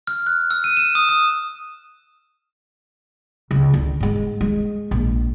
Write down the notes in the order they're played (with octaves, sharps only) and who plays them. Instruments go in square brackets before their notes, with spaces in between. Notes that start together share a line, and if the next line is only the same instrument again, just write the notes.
[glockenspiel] F6
F#6
E6
D#7
E7
D#6
D#6
[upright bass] C#2
D3
G#2 G#3
G#3
A#1